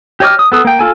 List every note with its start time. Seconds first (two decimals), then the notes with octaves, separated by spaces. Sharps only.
0.20 G4 C#5 D#5 D6 F6
0.39 D#6
0.52 B3 A4 D#6
0.65 A#3 G5
0.79 F4 A4 G#5